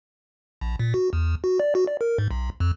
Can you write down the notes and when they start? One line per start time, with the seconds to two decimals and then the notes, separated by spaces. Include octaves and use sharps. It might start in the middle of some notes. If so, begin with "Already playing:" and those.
0.61 A#1
0.79 A#2
0.94 F#4
1.13 E2
1.44 F#4
1.60 D5
1.75 F#4
1.87 D5
2.01 A#4
2.18 G#2
2.31 B1
2.60 F2